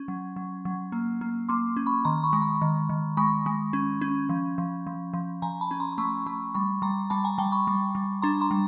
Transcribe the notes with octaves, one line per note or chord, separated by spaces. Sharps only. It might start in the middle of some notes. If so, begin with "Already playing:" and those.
Already playing: C#4
F#3
F#3
F#3
A#3
A#3
A#3 C6 D6
C#4
B5 C#6
D#3 A#5 C6
B5 C#6
G#3
B5 C#6
D#3
D#3
G#3 B5 C#6
G#3
C#4
C#4
F3
F3
F3
F3
F3 G#5 A#5
A5 B5
C#4
A#5 C6
C6
A3 B5 C#6
A3 B5 C#6
G3 B5 C#6
G3 A#5 C6
G3 A5 B5
G#5 A#5
G3 G5 A5
B5 C#6
G3
G3
D4 A#5 C6
A#5 C6
G3